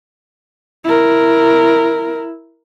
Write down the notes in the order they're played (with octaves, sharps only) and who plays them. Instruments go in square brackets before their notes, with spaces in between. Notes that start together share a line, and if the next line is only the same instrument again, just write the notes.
[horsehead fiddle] E4 A#4